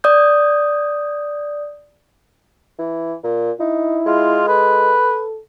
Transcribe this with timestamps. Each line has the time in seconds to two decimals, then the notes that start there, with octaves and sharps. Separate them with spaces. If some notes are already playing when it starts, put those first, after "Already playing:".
0.04 D5 D#6 G6
2.79 E3
3.24 A#2
3.60 D#4 E4
4.06 G#3 F4
4.48 A4 B4